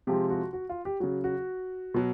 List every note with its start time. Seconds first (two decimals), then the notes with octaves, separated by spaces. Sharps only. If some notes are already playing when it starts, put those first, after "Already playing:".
0.07 C3 F3 G#3 G4
0.30 F#4
0.53 F#4
0.69 F4
0.85 G4
1.00 C#3 F#3 F#4
1.24 F#4
1.94 B2 F#3